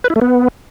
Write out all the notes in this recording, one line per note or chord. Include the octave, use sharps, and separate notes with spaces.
B4
E4
A3
B3